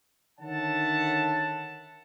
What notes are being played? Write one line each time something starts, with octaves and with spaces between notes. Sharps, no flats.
D3 D#3 C#5 E5 F#5 A5